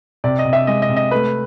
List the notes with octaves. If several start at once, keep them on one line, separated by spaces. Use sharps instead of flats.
C3 D5
D#5
C3
E5
G#3 D#5
D#5
C3
D#5
A3 B4